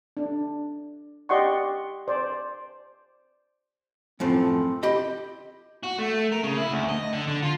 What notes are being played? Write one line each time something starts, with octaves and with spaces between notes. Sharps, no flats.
D4
G4 D5 D#5 F#5 C6 C#6
C5 D5
F#2 A2 F3 C4
G4 D#5 B5
F#4
A3
A#4
C#3
E4
D2
D#5
D3
D3
F4